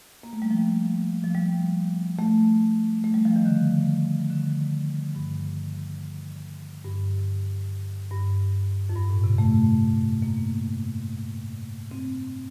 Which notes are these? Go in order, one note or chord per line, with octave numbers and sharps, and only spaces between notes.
A#3
A3
G3
F3
F3
G3
A3
A3
G3
F3
D#3
D3
D3
G2
G2
G2
F2
G2
A2
C3
A3
A#3
C4